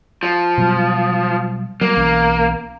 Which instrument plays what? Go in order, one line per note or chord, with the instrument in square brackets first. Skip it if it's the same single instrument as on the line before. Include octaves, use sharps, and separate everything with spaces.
[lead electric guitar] F3
[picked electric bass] B2 F#3 G3
[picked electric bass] F#3 G3 [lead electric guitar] A#3
[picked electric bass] B1 E3 C#4